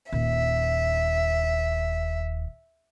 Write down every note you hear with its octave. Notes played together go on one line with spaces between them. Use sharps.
D#1 E5